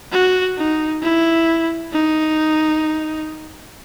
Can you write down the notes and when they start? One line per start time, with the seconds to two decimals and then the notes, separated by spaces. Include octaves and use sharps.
0.12 F#4
0.57 D#4
1.02 E4
1.92 D#4